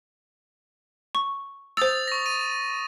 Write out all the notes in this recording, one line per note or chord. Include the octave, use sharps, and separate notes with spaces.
C#6
C5 D#6 E6 A6 F7
C#6 A#6
D#7